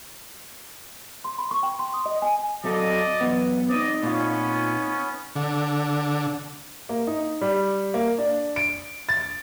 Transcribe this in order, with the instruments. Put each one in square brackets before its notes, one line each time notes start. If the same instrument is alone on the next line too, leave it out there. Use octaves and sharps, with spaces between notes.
[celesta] C6
B5
C#6
G5
C6
D#6
D#5
G#5
[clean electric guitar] F#3 C4 A4 [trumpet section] D5 D#5
[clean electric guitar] F#2 E3 [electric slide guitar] B3
[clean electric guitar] C4 D#4 [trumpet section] D5 D#5
[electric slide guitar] A#2 F4 [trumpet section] B3 C#4
[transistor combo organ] D3
[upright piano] A#3
D#4
G3
A#3
D4
D7
A6